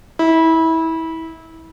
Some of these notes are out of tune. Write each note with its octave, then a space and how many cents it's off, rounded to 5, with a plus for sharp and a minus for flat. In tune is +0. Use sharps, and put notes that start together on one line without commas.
E4 -25